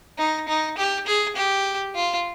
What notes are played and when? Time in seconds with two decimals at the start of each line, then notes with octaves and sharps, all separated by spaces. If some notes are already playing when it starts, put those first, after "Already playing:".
0.18 D#4
0.48 D#4
0.78 G4
1.07 G#4
1.36 G4
1.95 F4